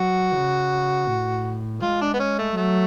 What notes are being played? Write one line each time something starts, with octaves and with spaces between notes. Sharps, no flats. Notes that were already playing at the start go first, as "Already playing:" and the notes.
Already playing: F#3 F#4
C#3
A2
G#3 F4
D4
B3
C#4
A3
F#3 A3